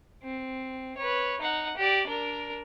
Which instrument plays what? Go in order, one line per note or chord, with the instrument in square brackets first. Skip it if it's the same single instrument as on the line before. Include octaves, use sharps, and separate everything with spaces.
[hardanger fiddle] C4
B4 C#5
D#4 F#5
G4 D5
D4 A#4